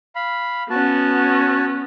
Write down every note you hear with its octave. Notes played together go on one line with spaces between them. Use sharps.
F5 B5
B3 C#4 F#4 A5